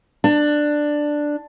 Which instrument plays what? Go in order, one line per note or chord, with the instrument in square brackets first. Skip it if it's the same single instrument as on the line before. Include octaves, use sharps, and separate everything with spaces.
[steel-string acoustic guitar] D4